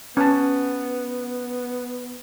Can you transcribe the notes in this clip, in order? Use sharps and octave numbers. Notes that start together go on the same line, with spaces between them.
B3 C#4 A5